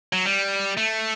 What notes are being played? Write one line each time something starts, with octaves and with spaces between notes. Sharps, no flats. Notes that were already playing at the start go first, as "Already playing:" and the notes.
F#3
G3
A3